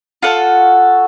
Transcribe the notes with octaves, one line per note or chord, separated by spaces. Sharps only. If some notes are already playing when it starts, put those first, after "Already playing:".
F4 F#4 A4 F#5